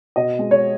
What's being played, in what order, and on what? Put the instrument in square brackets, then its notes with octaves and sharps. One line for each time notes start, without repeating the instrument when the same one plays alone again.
[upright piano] B2 D#5
G#3
C#5